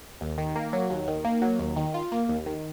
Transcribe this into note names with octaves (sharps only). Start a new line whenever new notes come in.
D#2
D#3
A#3
F#3
D#2
D#3
A#3
F#3
D#2
D#3
F4
A#3
D#2
D#3